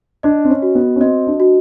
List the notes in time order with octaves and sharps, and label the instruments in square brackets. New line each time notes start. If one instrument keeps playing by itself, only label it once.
[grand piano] D4 [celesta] D#5
[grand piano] C4
C#4
[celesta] F#4
[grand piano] B3
C#4
[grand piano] C4 [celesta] D#5
[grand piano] D4
[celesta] F#4